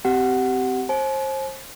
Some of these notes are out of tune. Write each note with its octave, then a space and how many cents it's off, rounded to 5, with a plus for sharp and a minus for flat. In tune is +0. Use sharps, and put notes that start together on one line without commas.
C4 -15 G4 -20 F#5 +0
C5 +30 G#5 +45